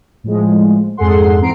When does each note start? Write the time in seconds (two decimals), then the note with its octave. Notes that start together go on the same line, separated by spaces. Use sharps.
0.24 A2 F3 G#3
0.97 F2 G#2 G#4 A4 F#5 C6
1.41 E3 C4 A#5 C7 D7